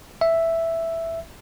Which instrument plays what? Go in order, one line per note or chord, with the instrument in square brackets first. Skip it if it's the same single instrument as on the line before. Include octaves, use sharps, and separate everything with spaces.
[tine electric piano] E5